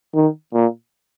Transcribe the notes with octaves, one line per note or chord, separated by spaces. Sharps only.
D#3
A#2